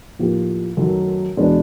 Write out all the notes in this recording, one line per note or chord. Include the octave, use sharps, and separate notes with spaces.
A2 F3 A#3 D#4 G4
F#2 D#3 F#3 A3
E2 B2 G#3 B3 D4